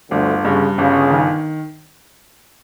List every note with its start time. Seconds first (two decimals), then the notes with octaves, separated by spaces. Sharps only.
0.10 G1 D2 D3
0.44 G2 C#3
0.77 G1 C#3
1.10 D#3